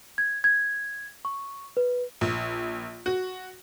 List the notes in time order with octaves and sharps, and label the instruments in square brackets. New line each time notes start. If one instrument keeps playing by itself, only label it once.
[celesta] G#6
G#6
C#6
B4
[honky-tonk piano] A#1
F#4